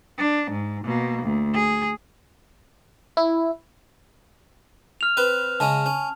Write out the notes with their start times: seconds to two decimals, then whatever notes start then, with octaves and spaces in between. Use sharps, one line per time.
0.18 D4
0.51 G#2
0.85 B2 A#3
1.23 D2
1.54 G#4
3.17 E4
5.01 F6 F7
5.17 C4 B4
5.60 C#3 G#3 C#4 A5
5.86 C#4